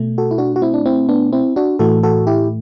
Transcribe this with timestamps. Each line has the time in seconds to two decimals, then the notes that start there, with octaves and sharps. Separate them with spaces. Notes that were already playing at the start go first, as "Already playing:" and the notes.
Already playing: B2 A3
0.18 F#4 A4
0.31 E4
0.38 D4 F#4
0.56 F#4
0.62 C4 E4
0.74 D4
0.86 C4 E4
1.09 B3 D4
1.33 C4 E4
1.56 D4 F#4
1.79 A2 E3 A3 F#4 A4
2.03 F#4 A4
2.27 E4 G4